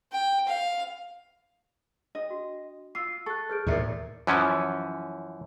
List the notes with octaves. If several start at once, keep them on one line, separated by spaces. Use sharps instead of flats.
G5
F5
D4 D#5
F#4
F4 D6 E6 C7
A4 C#6 F#6
G#4 B4 F6 G6 D7
D#2 A2 A#4 C#5 D5 E5 A#5
F#2 E3 F3 C#4